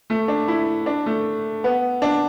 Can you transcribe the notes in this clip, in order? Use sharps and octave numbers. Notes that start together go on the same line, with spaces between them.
A3
D4
E4
D4
A3
B3
D4